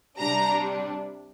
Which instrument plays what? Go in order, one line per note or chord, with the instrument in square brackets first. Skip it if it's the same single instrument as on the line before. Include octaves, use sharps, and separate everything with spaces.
[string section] C3 G3 D4 A#5